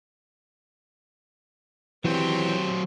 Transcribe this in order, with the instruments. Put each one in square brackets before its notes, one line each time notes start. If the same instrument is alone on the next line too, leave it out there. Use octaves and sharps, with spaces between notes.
[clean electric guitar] E3 [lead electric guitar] F#3 C5 [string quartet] C4 G4 C#5